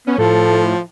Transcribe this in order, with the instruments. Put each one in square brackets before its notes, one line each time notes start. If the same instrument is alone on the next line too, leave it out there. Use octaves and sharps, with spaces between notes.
[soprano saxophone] B3 [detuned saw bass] C#4
[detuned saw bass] A2 [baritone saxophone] F3 [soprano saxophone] A4